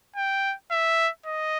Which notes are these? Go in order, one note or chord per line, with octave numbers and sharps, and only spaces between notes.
G5
E5
D#5